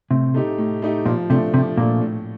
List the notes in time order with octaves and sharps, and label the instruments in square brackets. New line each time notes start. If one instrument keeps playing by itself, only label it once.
[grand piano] A2 [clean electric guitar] C3
[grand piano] A3 D#4 G4
A2
A3 D#4 G4
[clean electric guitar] A#2 [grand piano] F3
[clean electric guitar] C3 [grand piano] A3 D4
[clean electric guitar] C3 [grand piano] F3
[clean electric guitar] A#2 [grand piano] A3 D4
[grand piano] A2